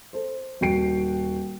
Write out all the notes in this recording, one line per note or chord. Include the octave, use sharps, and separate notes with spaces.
A4 C5
D#1 F#4 G5 C7 D7